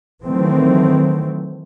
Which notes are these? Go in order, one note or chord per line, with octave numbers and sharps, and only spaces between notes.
D#3 E3 F#3 A3 C4